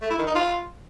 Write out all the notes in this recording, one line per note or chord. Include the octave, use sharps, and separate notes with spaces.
A3
E4
D#3
D#4
F4